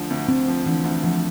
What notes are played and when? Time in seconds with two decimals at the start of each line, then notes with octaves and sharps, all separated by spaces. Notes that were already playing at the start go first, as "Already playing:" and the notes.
Already playing: D2 D3 F3
0.10 D2
0.28 D2 C4
0.48 F3
0.66 D3 E3
0.84 D2
1.03 D2 F3